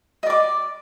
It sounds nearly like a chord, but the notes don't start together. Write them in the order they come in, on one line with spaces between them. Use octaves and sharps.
D#5 D5 D6